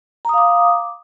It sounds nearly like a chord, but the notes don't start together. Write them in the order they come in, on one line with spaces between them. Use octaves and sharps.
A#5 D#6 F5 D6